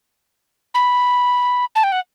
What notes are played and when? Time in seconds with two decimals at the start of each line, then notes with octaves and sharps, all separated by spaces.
0.74 B5
1.75 A5
1.84 G5
1.92 F#5